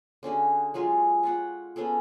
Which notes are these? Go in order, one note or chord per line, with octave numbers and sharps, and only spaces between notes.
D3 C#4 F#4 G#4
F#3 G#3 F4 G#4
F4 C#5 F#5
B3 C#4 G#4 A4